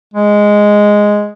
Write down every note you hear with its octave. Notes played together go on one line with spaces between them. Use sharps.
G#3